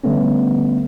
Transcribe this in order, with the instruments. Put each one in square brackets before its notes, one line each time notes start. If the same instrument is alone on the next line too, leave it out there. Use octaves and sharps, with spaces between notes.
[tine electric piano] D3 G3 A3 B3 C#4